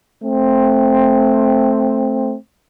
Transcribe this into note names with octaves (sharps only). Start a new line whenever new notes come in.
A3 C4